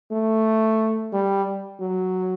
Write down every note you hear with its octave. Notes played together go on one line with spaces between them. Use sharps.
A3
G3
F#3